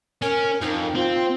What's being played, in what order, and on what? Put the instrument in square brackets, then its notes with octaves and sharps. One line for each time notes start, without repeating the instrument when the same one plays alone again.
[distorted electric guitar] C#4 [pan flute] A#4
[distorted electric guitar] F2 [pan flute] D#4
[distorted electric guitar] C4 [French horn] F4